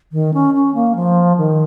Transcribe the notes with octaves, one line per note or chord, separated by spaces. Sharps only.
D#3
C#4
C#4
A#3
F3
D#3